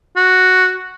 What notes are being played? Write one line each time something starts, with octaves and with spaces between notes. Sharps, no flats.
F#4